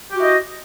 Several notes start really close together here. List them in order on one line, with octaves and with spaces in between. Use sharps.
G4 F#4 E4 D#5